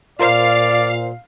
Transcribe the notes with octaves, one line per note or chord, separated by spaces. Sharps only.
A#2 F4 A#4 C5 D5 F5